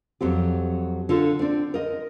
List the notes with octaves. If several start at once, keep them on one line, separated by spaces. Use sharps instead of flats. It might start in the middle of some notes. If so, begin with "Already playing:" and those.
F2 F#3 C4 G4
D3 F4 A4
C4 D4
A#4 D#5